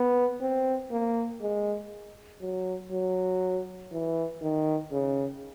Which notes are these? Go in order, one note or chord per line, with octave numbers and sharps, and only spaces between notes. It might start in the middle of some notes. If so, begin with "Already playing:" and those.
Already playing: B3
C4
A#3
G#3
F#3
F#3
E3
D#3
C#3